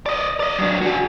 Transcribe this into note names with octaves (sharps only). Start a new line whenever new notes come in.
D5 D#5
D5 D#5
F#3 D4
F#4 G#4